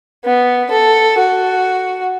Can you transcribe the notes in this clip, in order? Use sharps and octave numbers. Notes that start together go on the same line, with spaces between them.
B3
A4
F#4